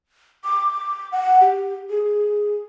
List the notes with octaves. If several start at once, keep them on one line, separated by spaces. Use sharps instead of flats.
D6
F#5
G4
G#4